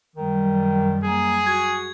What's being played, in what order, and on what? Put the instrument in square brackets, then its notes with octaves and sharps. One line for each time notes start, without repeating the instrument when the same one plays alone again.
[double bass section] F#2 G3 [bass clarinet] D#3
[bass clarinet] A#3 [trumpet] G#4
[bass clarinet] F#4 [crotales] G#6